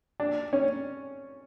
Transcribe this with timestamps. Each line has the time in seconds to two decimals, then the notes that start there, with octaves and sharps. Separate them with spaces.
0.20 D4
0.53 C#4